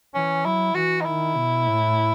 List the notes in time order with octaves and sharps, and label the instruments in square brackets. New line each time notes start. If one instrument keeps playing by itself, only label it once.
[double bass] E3 [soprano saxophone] C#4
[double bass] F#3 [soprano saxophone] E4
[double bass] E3 [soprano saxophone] F#4
[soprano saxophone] D#4
[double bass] D#3 [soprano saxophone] E4
[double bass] B2
A2